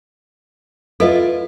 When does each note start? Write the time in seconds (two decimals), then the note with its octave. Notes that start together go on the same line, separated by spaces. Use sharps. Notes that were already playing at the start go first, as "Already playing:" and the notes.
1.00 E4 F4 A4 B4 D#5